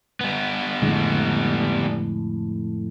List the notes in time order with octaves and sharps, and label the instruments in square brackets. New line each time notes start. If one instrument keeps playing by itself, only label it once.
[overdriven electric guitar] G3 B3
[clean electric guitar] F2 A2 [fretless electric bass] D3 G#3